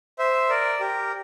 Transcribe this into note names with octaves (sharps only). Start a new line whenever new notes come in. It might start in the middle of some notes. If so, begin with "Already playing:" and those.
C5 E5
A#4 D5
G4 A#4